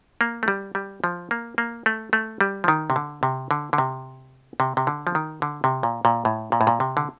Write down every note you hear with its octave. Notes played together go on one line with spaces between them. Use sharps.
A#3
A3
G3
G3
F3
A#3
A#3
A3
A3
G3
F3
D#3
C3
D3
C3
D3
D3
C3
C3
C3
D3
F3
D#3
D3
C3
A#2
A#2
A2
A#2
A2
A#2
C3
D3